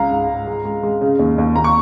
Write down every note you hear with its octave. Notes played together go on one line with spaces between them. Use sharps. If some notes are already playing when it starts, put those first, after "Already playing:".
Already playing: C#2 G#3 F5 A#5
G#2
G#2
G#3
G#3
G#3
C#3
D#2
D#2
D#2 A#5
C#6